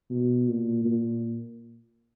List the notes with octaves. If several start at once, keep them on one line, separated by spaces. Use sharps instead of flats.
B2
A#2
A#2